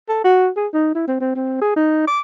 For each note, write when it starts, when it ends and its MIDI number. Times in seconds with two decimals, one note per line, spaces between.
0.08 0.21 69
0.24 0.48 66
0.56 0.67 68
0.74 0.93 63
0.95 1.07 64
1.07 1.15 60
1.20 1.34 60
1.35 1.57 60
1.61 1.74 68
1.76 2.03 63
2.07 2.20 86